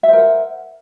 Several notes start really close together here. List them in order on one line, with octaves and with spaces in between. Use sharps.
E5 C5 A#4 F#5